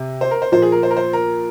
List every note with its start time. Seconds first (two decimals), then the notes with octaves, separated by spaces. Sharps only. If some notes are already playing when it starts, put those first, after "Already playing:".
Already playing: C3 G4
0.21 C5
0.31 A#4
0.42 C5
0.52 A#2 F3 A#3 C5
0.62 G#4
0.72 A#4
0.83 C5
0.91 A#4
0.97 C5
1.13 A#4